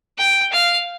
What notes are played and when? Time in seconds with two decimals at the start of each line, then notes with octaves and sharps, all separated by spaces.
0.18 G5
0.52 F5